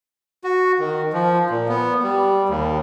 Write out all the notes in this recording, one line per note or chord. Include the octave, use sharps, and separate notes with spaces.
F#4
D#3
F3
A#2
B3
G3
D#2